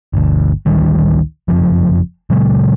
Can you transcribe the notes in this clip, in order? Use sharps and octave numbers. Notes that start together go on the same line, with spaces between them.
G1 D2
A1 D2 D#3 G3
F#1 F2 F3
A#2 C#3 F#3 G#3